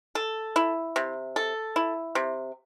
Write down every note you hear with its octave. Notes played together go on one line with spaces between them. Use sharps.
A4
E4
C3
A4
E4
C3